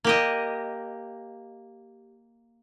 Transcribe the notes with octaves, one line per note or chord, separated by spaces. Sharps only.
A#3 G4 D#5